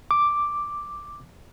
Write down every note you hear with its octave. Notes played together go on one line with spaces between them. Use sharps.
D6